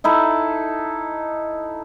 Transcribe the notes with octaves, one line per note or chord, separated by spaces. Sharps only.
D#4 E4 A4